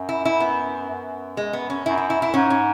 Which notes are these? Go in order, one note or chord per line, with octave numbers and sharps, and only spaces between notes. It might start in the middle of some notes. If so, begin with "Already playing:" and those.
Already playing: F#2
E4
E4
B3
F#2
G#3
B3
C#4
F#2 E4
E4
E4
E4
F#2
G#2 C#4
C#4